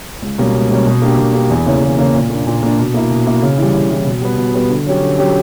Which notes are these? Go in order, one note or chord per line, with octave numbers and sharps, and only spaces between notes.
C#2
B2 G3 A#3 C#4
C#2
B2 G3 A#3 C#4
B2
A#3 D4 G4
B2
A#3 D4 G4
E2
C#3 E3 A#3 C#4
E2
C#3 E3 A#3 C#4
A#2
A#3 D4
A#2
A#3 D4
B2
A#3 E4
B2
A#3 E4
C#3
E3 G3
C#3
E3 G3
B2
G3 B3
B2
G3 B3
D3
F#3 C#4 G4
D3
F#3 C#4 G4